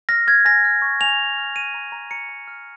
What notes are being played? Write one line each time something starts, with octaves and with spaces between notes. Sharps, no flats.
F6 A#6
F6 G#6
G#5 A#6
F6
C#6
G#5 F7
G#5
F6
F6 D#7
A#5
A#5
A#5 C#7
A#5
F6